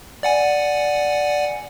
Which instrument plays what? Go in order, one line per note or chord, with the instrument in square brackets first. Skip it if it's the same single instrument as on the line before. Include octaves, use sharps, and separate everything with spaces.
[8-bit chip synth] D5 F#5 G#5